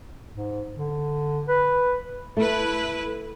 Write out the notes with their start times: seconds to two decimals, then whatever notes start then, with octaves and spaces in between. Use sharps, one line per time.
0.33 G#2
0.76 D3
1.48 B4
2.37 A3 E4 B4